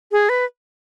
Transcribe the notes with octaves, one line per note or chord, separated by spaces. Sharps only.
G#4
B4